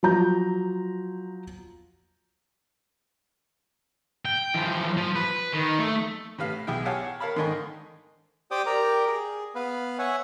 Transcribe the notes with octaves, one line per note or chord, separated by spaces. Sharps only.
F3 F#3 A#5 G6
G5
E3 F3
F3
B4
D#3
A3
A2 C3 B4 F5
B1 B3 E4 G#4 G5
G4 C#5 F5 F#5 G#5 A5
A#4 C#5 F5 A5 B5
G#2 D3 D#3 D#5 G#5 C#6
G4 C5 D5 G5 D6 D#6
G4 A#4 D5 A#5
G#4
B3 B4 F5
C#5 E5 F#5 G#5